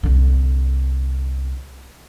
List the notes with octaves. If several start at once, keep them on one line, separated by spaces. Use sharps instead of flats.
C2 D3